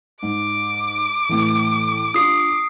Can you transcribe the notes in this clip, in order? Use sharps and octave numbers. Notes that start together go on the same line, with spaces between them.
G#2 D6
A2 E3
D4 F4 D#6 C7